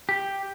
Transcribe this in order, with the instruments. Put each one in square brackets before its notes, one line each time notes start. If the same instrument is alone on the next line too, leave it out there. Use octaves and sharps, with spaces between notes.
[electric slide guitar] G4